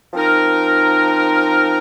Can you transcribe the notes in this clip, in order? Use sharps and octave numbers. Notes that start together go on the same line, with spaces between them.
F3 C4 D#4 A#4